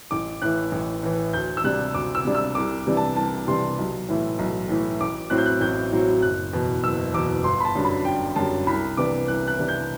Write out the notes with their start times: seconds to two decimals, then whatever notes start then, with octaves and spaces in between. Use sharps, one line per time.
0.11 A1 D6
0.42 A2 E3 F#6
0.72 A1
1.03 A2 E3
1.33 D2 G6
1.57 E6
1.64 C3 G3 D4 F#6
1.94 D2 D6
2.15 E6
2.25 C3 G3 D4
2.35 E6
2.55 C2 D6
2.87 C3 E3 G3 D4
2.97 A5
3.16 C2 A5
3.48 C3 E3 G3 D4 C6
3.78 B1
4.09 A2 E3 A3 E4
4.39 B1
4.69 A2 E3 A3 E4
5.01 A1 D6
5.30 A2 F#3 C4 F#6
5.38 G6
5.46 F#6
5.61 A1 G6
5.92 A2 F#3 C4
6.22 F#1 F#6
6.53 E2 B2
6.83 F#1 E6
7.14 E2 B2 D6
7.44 G1 C6
7.60 B5
7.65 A5
7.75 F#2 D3 G3
7.85 B5
8.05 G1 G5
8.36 F#2 D3 G3 A5
8.66 C2 B5
8.97 C3 E3 B3 D4 D6
9.28 C2 F#6
9.48 F#6
9.59 C3 E3 B3 D4
9.68 G6